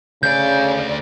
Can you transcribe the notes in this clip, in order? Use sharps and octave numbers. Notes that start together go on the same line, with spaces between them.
D2 C#3 D5 G6